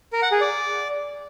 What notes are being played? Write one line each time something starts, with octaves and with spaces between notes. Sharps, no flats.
A#4
F#5
G#4
D5